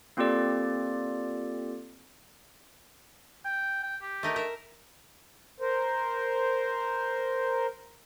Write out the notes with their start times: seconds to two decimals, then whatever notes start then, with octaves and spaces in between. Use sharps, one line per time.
0.17 A#3 C4 F4 G4 A4 D5
3.45 G5
3.83 G5
4.02 G4
4.23 A3 D#4 A#4
4.36 A#4 E5
5.60 A#4 C5